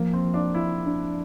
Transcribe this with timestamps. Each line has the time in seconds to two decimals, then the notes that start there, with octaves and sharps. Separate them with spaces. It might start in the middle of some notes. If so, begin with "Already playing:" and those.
Already playing: F3 A#3
0.13 C4
0.24 F3
0.34 D4
0.54 F3 E4
0.86 D4